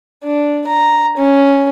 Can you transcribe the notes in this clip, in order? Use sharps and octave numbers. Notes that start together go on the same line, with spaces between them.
D4
A#5
C#4